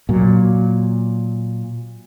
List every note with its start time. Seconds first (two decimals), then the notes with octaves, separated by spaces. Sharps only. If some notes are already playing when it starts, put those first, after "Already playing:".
0.09 A#2 F#3